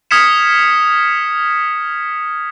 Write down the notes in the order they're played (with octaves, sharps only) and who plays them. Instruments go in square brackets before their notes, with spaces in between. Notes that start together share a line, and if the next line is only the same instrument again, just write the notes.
[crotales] D#6 F6 G#6 B6 C#7 E7